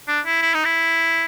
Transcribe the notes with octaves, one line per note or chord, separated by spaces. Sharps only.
D4
E4
E4
D#4
E4